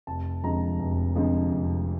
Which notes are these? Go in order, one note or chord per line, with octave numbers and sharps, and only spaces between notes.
F1 A5
F2 D3 F3 G#3 A#5
F1
F2 D3 F3 G#3
F1